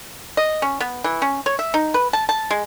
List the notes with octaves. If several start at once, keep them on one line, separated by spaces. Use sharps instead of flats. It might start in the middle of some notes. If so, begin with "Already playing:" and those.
D#5
C#4
B3
E3
C#4
C#5
E5
D#4
B4
A5
A5
G#3